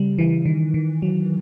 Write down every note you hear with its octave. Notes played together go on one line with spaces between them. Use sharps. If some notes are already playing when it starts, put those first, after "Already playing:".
Already playing: C#3 G3
E3
D#3
D#3
F#3